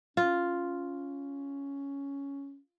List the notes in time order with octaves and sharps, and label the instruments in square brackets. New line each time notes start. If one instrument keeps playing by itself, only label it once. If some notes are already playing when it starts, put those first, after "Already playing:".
[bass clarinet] C#4 [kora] F4